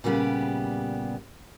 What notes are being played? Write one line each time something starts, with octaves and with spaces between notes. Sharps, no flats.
A#2 C#3 G3 B3 G4